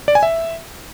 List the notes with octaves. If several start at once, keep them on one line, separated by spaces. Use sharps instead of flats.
D5
G#5
E5